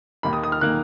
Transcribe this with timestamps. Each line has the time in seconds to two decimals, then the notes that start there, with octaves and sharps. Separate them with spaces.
0.23 D#2 D#3 A#3 B5
0.33 D#6
0.44 D#6
0.52 F6
0.61 D#3 A#3 F#6